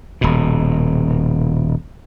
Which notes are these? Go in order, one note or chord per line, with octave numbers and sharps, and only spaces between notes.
D#1 B2